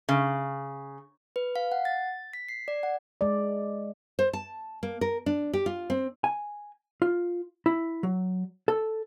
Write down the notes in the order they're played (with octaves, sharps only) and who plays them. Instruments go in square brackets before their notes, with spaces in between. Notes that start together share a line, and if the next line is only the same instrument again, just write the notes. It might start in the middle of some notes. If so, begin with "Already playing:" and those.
[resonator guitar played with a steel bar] C#3
[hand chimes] B4
F5
F#5
A6
B6
C7
D5
F#5
[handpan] G#3 D5
[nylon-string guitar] C5
A5
A#3
A#4
D4
G4
F4
C4
[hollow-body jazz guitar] G#5
F4
E4
F#3
A4